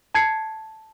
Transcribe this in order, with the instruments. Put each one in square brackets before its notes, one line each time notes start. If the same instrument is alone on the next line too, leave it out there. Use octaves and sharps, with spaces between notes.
[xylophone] A5 G#6 C7 C#7